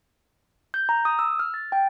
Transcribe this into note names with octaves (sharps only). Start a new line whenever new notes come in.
G6
A#5
D#6
E6
F6
A6
G5